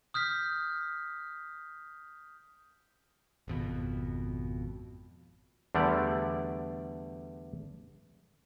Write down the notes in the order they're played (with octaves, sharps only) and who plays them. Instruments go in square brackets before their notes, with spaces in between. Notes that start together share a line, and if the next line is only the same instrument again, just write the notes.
[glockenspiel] D#6 F6 G6 B6
[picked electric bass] G#1 F2 B2
[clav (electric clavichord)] E2 D3 G3 A3 D5